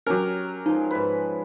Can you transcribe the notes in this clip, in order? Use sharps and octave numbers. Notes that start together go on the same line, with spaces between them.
F#3 C#4 G4 A#4
F3 G#3 D#4
G#2 B4